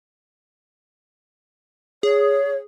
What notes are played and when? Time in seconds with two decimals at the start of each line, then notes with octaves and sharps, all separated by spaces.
2.03 G#4 C#5